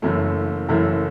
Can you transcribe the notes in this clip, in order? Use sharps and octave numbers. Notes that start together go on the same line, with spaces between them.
F#1 F#2 E3 A3 E4
F#1 F#2 E3 A3 E4